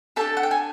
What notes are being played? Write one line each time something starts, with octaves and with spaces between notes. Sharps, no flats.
D4 G4 A4 A5
F#5
G5
G#5